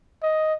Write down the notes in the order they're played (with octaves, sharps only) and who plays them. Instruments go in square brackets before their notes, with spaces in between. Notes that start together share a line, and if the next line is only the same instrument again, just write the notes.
[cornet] D#5